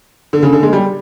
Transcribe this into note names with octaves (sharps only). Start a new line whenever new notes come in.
D3
C#3
D3
G#3
G3